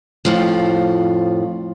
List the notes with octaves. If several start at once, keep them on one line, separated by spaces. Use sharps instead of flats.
F2 A2 F3